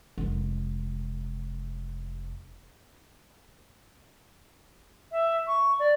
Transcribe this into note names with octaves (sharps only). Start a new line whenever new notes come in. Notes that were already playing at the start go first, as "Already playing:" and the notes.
F1 G#3
E5
C#6
D5